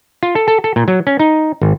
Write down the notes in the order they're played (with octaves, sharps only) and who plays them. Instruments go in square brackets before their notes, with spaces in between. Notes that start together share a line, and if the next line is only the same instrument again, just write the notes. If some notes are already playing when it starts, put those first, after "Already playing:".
[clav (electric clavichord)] F4
A4
A4
A4
A#2
F#3
C#4
D#4
G#1